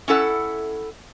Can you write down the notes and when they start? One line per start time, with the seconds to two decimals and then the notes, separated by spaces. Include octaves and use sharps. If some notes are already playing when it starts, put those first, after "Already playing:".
0.08 C#4 E4 A4 F#5